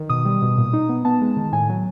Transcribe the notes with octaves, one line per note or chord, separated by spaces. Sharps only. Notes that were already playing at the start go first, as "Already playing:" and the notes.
Already playing: D#3
B2 D#6
G3
B2
A#2
D#4
B3
B3 A5
G#3
D#3
A2 G#5
F#3